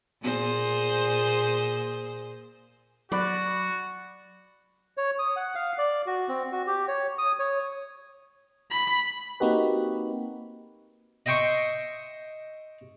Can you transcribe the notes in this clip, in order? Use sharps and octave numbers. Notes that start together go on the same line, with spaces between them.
A#2 G#4 C5
F#3 F#4 D5 B5 F#6
C#5
D#6
F#5
F5
D5
F#4
C4
F#4
G4
C#5
D#6
C#5
B5
A#3 C4 D#4 F#4 G4 B4
D#5 E5 G5 C6 C#6